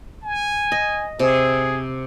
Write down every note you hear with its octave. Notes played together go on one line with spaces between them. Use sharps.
G#5
D#5
C3 G#4